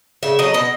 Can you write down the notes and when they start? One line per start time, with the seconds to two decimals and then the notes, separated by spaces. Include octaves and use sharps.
0.23 C#3 E5
0.39 F#3 A3 D#5
0.54 B2 D#5